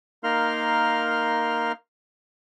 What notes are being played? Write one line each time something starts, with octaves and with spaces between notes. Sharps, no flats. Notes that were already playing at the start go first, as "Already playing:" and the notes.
A#3 D#4 A#4 F5 C6 F6